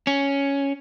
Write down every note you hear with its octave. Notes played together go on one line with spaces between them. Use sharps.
C#4